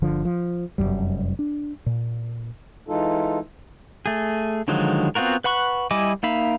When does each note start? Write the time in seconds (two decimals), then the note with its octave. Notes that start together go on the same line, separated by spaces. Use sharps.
0.02 G1 D3 F3
0.25 F3
0.78 F1 B1 F#2 G3
1.39 D4
1.86 A#2
2.88 E3 G#3 D#4 F4 A4
4.06 A3 G#4
4.68 D3 D#3 F3 F#3 G#3
5.15 B3 C4 F4 F#4 A#4
5.44 B4 F#5 B5 C#6
5.91 G3 E4 D#5 G#5 D6
6.23 A#3 D#4 E5 F5 B5